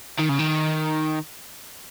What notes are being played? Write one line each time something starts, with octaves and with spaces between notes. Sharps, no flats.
D#3
C#3
D#3